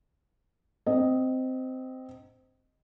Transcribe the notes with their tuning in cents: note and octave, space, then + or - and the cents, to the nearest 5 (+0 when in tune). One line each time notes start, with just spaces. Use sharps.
C4 -10 D#5 +0